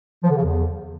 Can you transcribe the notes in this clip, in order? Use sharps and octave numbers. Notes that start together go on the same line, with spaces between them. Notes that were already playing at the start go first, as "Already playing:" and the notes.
F3
D3
C#3
E2